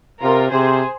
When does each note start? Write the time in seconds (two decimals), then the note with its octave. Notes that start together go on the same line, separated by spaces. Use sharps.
0.22 C3 F4 A#4
0.52 C3 G#4 C5